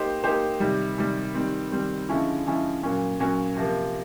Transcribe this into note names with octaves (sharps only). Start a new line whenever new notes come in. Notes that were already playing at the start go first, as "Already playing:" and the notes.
Already playing: A#3 D#4 G4 C5
A#3 D#4 G4 C5
C3 D#3 G3
C3 D#3 G3
D#3 G3 C4
D#3 G3 C4
D3 F3 G#3 C#4 E4
D3 F3 G#3 C#4 E4
A#2 F#3 A#3 C#4
A#2 F#3 A#3 C#4
C3 F3 A#3